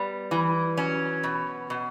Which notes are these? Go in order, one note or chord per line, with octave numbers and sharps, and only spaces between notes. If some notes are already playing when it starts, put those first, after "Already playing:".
Already playing: G3 B3
E3
F#3 C#4
B2
B2